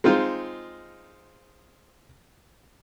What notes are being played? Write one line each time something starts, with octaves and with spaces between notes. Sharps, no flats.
G#3 C4 D#4 F4